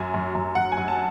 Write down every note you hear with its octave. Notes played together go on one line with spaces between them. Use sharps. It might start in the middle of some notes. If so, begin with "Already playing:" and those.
Already playing: F#2 F#3 G#5
F#2
F#2
F#2 F#5
G#5
F#2
A5